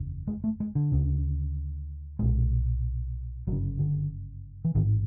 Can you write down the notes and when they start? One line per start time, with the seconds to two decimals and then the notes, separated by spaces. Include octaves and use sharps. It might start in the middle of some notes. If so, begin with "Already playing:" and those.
Already playing: F#1 E2 C#3
0.28 G#3
0.44 A3
0.60 G#3
0.75 D3
0.92 D2 C#3
2.19 B1 A#2 G#3
3.47 G1 F#2 C#3 F#3
3.79 D3
4.65 E3
4.75 A1 G#2 D#3